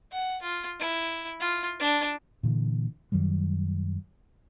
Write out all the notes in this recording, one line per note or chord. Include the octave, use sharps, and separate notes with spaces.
F#5
F4
E4
F4
D4
A#2 D3 E3
F#2 D#3 F#3 G3